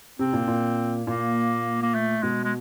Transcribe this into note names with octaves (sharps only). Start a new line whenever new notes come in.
C3 C4
A#2
A#2
A#2 A#3
A#3
A3
B2 G#3
G#3